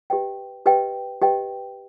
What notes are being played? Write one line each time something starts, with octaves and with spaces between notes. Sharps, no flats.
G4 B4 D#5 G5
G4 B4 D#5 G5
G4 B4 D#5 G5